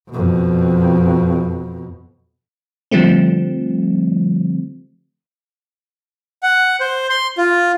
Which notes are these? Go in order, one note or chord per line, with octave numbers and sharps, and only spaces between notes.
F2 B2
D3 F3 G3 A3 C4
F#5
C5
C6
F4